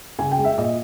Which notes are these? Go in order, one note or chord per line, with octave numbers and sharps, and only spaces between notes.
C#3 G#5
G5
G#3
E5
A#2 D#5